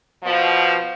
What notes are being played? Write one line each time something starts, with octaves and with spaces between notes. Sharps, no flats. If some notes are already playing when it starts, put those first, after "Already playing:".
B2 F3